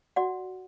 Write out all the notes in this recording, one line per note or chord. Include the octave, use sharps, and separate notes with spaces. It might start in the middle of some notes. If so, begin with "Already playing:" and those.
F#4 D5 F#5